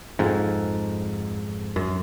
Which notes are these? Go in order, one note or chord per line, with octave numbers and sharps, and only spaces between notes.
F2 G#2
F#2